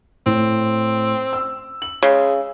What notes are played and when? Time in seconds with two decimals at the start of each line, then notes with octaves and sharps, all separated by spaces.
0.26 A2 C4
1.33 E6
1.82 F#7
2.03 C#3 G#3